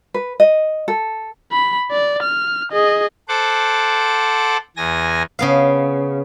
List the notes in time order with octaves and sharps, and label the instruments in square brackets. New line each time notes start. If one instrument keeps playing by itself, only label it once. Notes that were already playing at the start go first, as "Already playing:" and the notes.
[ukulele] B4
D#5
A4
[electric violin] B5
D5
F6
G#4 D#5
[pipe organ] A4 C5 F#5 D6
E2 G#5 A#6
[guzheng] C#3 B3 F5